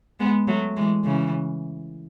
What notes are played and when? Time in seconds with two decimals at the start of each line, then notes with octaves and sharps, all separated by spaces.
0.20 G#3 B3
0.47 F#3 A3
0.77 E3 G#3
1.04 C#3 E3